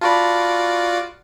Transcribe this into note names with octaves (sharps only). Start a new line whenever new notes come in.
F4 F#4 D5 A5 B5